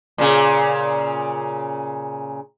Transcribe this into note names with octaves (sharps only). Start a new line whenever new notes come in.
A#2 C#3